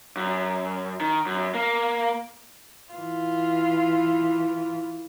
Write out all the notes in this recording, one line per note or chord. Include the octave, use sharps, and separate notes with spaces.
F#2
D#3
F#2
A#3
E3 F4